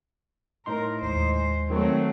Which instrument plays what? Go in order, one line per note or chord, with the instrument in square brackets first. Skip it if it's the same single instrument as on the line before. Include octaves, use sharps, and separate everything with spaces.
[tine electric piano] A2 D#4 C6 [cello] A#4
[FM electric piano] D#2 [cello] G#3 C5
[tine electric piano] D#3 [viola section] F#3 A3 [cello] C4